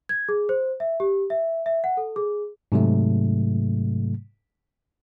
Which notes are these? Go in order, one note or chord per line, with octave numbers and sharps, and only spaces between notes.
G#6
G#4
C5
E5
G4
E5
E5
F#5
A4
G#4
G#2 C3 F#3 A3